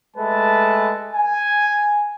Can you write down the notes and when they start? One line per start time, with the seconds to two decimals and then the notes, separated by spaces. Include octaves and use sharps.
0.17 G#3 A3 B4 A5
1.15 G#5